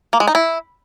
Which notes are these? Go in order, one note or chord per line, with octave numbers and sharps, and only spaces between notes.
A#3
G#3
D#4
E4